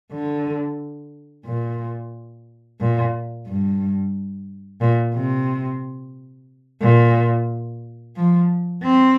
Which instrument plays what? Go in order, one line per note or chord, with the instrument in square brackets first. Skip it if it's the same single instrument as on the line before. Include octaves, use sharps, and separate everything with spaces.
[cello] D3
A#2
A#2
G2
A#2
C3
A#2
F3
C4